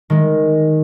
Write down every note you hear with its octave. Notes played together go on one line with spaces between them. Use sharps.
D#3 G#3